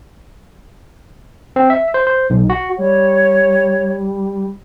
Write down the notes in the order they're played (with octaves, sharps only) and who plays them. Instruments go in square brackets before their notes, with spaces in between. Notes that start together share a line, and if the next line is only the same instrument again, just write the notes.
[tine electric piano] C4
E5
C5
C5
B1
F#4
[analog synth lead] G3 [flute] C#5